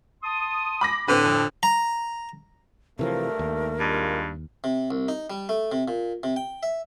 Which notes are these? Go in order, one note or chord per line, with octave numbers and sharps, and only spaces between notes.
A5 C6 D#6
B5 D6 A#6
A2 D3 C4 B4
F2
A#5
G2 C3 E3 F3 A3 A#4
D#2
G2 G#3 A#3 F4
C3
C2
D#4
G3
A3
C3
A#2
C3
G5
E5